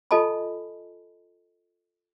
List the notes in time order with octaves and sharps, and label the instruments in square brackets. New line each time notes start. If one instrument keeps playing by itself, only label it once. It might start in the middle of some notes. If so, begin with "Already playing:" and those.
[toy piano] F4 A4 D#5 G#5 A5 B5